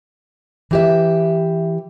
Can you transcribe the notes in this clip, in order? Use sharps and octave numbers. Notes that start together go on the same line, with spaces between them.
E3 G4 E5